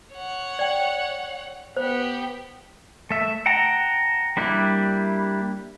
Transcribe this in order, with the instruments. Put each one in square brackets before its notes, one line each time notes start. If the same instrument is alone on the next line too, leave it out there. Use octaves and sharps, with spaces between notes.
[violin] C#5 F#5
[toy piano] D5 G5
[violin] B3 G4 [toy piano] C5
[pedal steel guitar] A3 E5
F#5 G5 A5 A#5
G3 A#3 D4 E4 G4